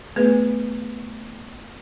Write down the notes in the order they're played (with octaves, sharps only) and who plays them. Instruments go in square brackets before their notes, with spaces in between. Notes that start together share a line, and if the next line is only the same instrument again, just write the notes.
[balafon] A3 B3 G#4 B4